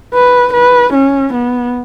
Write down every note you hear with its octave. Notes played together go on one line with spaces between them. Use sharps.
B4
B4
C#4
B3